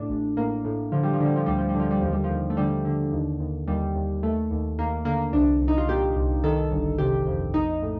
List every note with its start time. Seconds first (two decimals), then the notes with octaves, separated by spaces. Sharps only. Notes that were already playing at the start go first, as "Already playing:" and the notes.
Already playing: A2 D4
0.09 A1
0.37 A2 A#3
0.65 A2
0.92 D3 F3
1.03 G3
1.13 F3
1.20 D3 G3
1.36 F3
1.46 D2 G3
1.58 F3
1.69 G3
1.75 D3 F3
1.91 G3
2.01 D#2 F3
2.13 G3
2.24 F3
2.30 D#2
2.50 A3
2.57 D3 G3
2.85 D3
3.13 D#2
3.40 D#2
3.67 D#2 G3
3.95 D#2
4.23 D#2 A3
4.51 D#2
4.78 D#2 A#3
5.05 D3 A#3
5.33 C2 D4
5.61 C2
5.68 D#4
5.78 F4
5.88 A#2 G4
6.16 C2
6.44 D#3 A4
6.72 G1
6.98 C3 G4
7.27 F2
7.54 A#1 D#4
7.82 A2